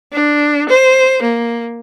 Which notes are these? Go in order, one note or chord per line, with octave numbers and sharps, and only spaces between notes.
D4
C5
A#3